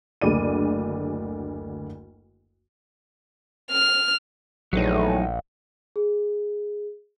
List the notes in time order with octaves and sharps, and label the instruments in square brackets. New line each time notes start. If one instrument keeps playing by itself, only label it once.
[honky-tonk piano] F#1 D2 D3 G#4 D5 D#7
[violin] F6
[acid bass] A#1 [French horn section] E2 A2 [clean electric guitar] F#3 D#4
[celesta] G#4